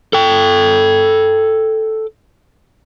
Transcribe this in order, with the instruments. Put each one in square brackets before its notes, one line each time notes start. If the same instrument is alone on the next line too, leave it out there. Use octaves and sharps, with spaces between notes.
[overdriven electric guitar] A4 G5